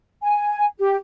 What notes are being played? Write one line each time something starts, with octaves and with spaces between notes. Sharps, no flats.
G#5
G4